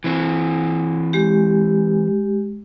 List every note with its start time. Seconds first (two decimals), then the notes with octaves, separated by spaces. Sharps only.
0.04 E3 C4
1.13 G#3 G4